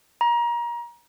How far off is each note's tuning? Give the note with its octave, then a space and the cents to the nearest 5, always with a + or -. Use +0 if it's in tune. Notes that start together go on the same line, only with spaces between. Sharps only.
A#5 +30